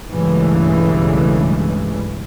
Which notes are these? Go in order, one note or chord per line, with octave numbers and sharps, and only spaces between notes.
B1 G2 C#3 E3 G#3 A3